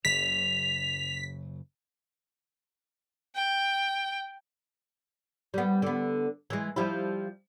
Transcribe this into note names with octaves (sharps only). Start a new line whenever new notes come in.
F#1 C#3 F#3 B6 F7
G5
G3 B3
D3 B3
E3 G#3
F3 G3 E4